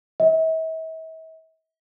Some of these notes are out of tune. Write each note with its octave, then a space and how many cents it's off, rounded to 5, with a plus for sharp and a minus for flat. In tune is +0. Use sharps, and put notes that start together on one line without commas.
E5 -40